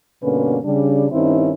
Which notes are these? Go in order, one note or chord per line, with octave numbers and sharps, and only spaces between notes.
G2 B2 D3 A#3 C#4 B4
C#3 G3 D4
G2 D#3 C4 C#4 D#4 E4